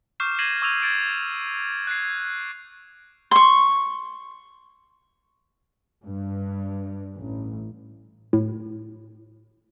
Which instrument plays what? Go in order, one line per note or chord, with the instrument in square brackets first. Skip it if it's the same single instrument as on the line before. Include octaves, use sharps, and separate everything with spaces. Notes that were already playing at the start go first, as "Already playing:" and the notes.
[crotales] C#6 D6 F6 G6 C7 E7
G#6 A#6 C7 D#7 E7 F#7
C#6 D6 E6 G#6 D#7 F7
G#6 A6 D7
F#6 G#6 C7
[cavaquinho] C6 C#6
[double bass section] G2
A1
[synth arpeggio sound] A2